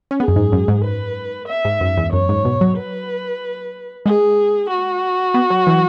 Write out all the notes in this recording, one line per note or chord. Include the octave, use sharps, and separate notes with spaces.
C#4
B3 G#4
F#2
G#2
F#2
G#2
B4
E5
G#2
F#2
E2
F#2 C#5
G#2
B2
F#3
B4
G#3 G#4
F#4
B3
F#3
E3